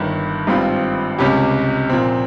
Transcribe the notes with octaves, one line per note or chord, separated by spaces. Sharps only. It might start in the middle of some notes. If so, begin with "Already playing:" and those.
Already playing: G1 G2 D#3
G#1 G2 G3 C4 F4
C#2 C3 G3 C#4 G4
A#2 F3 C4